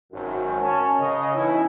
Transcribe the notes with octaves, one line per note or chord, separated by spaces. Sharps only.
G#1 F#2
C#4 A#4 G#5 A5
C#3 D#5
B2 E3 C#4 D#4 E4